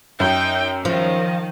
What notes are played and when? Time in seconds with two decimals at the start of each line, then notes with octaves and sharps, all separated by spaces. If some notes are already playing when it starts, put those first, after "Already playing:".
0.20 F#2 D#4 G5
0.85 D#3 F3